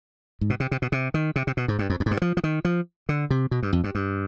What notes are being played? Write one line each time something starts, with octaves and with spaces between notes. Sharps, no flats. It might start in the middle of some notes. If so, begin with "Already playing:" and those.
G#2
B2
C3
C3
B2
C3
D#3
C3
C3
B2
G#2
G2
F2
F2
G#2
G2
F3
F3
D#3
F3
D3
C3
B2
G2
F2
G2
G2